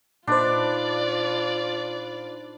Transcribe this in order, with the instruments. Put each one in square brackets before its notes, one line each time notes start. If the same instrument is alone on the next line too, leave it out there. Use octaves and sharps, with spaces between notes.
[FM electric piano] A#2 D#4 C5 [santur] D4 B4 [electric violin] F4 D5